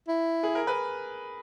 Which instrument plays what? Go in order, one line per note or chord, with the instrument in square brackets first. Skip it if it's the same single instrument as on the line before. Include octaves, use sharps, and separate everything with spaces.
[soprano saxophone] E4
[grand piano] G#4
A#4
B4